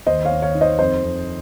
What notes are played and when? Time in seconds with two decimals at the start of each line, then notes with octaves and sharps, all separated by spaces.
0.07 D#2 C5 D#5
0.25 C#5 F5
0.31 D#2
0.42 C#5 F5
0.55 D#3
0.61 C5 D#5
0.79 F2 C5 D#5
1.04 F2